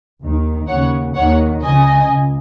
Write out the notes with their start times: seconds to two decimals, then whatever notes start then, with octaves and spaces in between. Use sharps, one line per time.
0.22 D#2 D#3
0.68 D#2 C#3 C#5 F#5
1.15 D#2 D#3 C#5 F#5
1.62 C#2 C#3 D#5 G#5
2.09 C#2